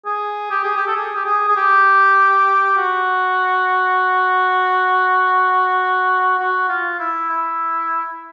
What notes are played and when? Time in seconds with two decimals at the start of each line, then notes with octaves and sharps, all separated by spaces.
0.05 G#4
0.51 G4
0.64 G#4
0.76 G4
0.87 A4
0.96 G#4
1.15 G4
1.25 G#4
1.48 G#4
1.56 G4
2.77 F#4
6.39 F#4
6.69 F4
6.99 E4
7.29 E4